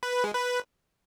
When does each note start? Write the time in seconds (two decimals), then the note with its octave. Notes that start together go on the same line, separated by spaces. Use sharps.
0.03 B4
0.13 B4
0.24 G#3
0.35 B4